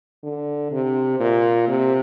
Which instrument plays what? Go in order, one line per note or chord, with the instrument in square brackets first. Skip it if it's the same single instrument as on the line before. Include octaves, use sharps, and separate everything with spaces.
[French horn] D3
C3
A#2
C3